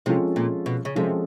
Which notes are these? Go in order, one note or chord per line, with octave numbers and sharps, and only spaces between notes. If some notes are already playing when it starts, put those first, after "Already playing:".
C3 F3 G#3 C#4 F4 A4
A#2
B2
C#3
C3 F3 G#3 C#4 F4 A4